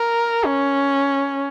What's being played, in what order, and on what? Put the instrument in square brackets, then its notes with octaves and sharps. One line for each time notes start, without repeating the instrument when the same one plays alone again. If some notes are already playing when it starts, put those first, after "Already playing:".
Already playing: [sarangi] A#4
C#4